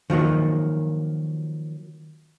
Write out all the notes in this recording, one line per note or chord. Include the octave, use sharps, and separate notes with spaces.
D#3 F3 F#3 A#3